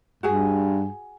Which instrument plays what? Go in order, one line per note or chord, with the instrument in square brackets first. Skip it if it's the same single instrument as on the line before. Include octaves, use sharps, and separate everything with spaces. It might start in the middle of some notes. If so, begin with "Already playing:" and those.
[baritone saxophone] G2 [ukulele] F#4 G#4 G#5